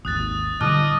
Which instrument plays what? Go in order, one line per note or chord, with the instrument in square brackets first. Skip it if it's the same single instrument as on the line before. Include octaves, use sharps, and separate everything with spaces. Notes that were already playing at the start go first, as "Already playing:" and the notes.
[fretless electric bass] G#1 D#2 [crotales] D#6 F#6 A6
[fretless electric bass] A2 D3 G3 [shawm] D#5 [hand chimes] A5 D6 F#6 [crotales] F6